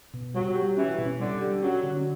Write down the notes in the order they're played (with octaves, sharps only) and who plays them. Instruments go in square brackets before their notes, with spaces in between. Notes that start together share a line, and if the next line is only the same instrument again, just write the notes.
[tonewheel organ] B2
[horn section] F#3 [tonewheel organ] G3
[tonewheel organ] G4
[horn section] E3 [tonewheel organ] C#4
[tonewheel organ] B2
[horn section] D3 [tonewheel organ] G3
[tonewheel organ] G4
[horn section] F#3 [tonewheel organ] C#4
[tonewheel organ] D3